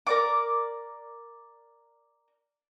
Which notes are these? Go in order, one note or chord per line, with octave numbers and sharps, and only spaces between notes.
A#4 D5 D6